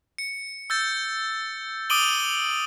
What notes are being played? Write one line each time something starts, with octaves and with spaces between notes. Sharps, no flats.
C#7
E6 G6 A6
D6 D#6 D7 D#7 F#7 G7